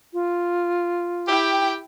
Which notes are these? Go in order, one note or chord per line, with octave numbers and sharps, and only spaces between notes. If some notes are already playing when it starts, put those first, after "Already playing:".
F4
E4 G4 G5